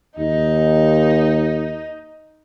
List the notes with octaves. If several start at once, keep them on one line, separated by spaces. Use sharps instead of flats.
D#2 D#4